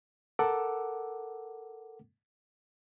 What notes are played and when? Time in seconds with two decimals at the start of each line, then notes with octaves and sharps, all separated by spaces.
0.39 A4 A#4 F#5 D6 E6